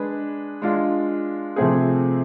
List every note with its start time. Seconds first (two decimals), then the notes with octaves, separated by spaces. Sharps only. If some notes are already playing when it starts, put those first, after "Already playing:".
Already playing: G#3 D4 G#4 B4
0.62 G#3 D4 F4
1.56 C3 F3 A3 C4 G#4